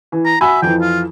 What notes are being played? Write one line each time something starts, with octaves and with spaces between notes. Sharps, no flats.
E3
A#5
F#4 E5 G#5 B5
F2 E3 G5
F4